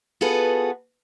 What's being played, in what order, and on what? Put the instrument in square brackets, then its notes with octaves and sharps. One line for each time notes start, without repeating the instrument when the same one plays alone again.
[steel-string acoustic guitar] B3 F4 F#4 G#4 A4 B4